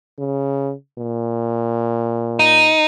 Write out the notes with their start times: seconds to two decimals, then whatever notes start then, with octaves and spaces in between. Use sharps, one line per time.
0.19 C#3
0.99 A#2
2.39 D#4